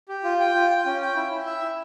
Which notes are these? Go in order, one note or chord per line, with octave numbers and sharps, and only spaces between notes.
G4
F4
G5
F4
G5
C#4
G5
E4
E4
E5
E4